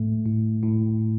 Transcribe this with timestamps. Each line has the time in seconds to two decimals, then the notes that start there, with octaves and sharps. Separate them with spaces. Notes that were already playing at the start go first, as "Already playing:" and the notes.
Already playing: A2 A3
0.26 A2
0.63 A2